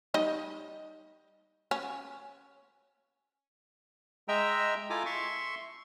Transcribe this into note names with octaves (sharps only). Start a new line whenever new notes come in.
G3 D#4 D#5
C#4
G#3 D#5 E5 G5 A#5 E6
E4 F4 A4 G#5 A#5 D6
E5 C6 C#6